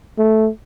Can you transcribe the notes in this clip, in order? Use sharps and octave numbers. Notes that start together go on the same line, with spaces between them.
A3